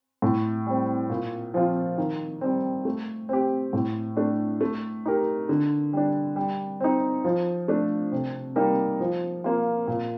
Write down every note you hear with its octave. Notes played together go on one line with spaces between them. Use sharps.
A2
G3 C4
A#2
F3 C4 F4
D#3
G3 C4
A3
C4 G4
A2
A3 D4
A3
D#4 G4 A#4
D3
G3 D4
G3
C4 D#4
F3
A3 D4
C3
G3 A#3 D#4 A#4
F3
A#3 F4
A#2